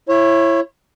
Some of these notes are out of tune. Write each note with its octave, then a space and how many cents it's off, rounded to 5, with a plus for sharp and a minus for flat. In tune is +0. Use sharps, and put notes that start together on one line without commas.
E4 +20 C#5 -25